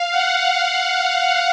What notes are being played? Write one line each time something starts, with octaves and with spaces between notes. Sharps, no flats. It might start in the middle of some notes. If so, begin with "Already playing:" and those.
Already playing: F5
F#5